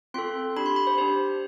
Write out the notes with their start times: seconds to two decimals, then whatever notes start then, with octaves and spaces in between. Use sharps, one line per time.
0.14 C4 F4 A4 C6
0.57 D4 G4 B5
0.66 C6
0.76 B5
0.87 C5
0.98 D4 G4 C5